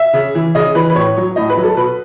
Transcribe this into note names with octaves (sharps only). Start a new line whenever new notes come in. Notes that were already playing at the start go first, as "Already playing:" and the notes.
Already playing: E5
C#3
E3
C#3 D#5
E3 B4
B4
A2 C#5
F#3
A2 D#5
B4
F#3
A4
B2 B4